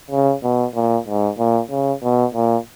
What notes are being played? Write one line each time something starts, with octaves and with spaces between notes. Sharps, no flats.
C#3
B2
A#2
G#2
A#2
C#3
B2
A#2